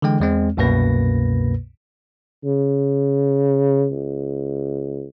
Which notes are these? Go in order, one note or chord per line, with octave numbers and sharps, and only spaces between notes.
D3 E3 G#3 G5
E2 G#3 C4
C2 F#2 B2 A#3 B4 A#6
C#3
C#2